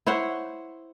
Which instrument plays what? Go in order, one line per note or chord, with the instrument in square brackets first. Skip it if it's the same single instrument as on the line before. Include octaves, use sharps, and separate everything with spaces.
[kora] E4 C5 C#5 F#5